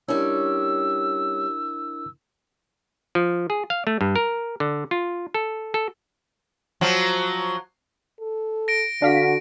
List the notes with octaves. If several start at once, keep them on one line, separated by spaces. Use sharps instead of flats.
G3 C#4 D4 E4 A#4 E6
F3
G#4
F5
A3
G2
A#4
D3
F4
A4
A4
F3 F#3
A4
A#6 D7
D3 D4 F#4 F5 B6